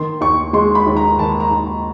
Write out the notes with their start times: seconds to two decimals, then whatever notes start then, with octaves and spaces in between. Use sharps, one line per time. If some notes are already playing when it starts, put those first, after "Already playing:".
Already playing: D#3 C6
0.21 D#2 C#6
0.53 G#3 C6
0.75 B5
0.86 D#2
0.97 A#5
1.18 D#3 A5
1.40 A#5
1.51 D#2